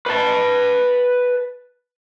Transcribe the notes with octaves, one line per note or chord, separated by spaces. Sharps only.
B4 A5